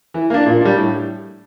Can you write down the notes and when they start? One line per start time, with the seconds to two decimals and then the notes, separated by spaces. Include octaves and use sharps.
0.14 E3
0.30 A#3 D4
0.46 A#2
0.61 G3 D4
0.77 A2